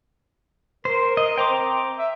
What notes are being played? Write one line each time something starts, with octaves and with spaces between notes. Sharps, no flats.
A#4 C5
D#5
C5 G5 A#5 D6
C4
E5